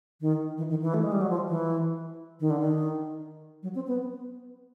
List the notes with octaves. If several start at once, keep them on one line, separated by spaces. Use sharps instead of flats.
D#3
E3
D#3
E3
A3
G#3
G3
F#3
F3
E3
D#3
D3
D#3
F#3
C4
B3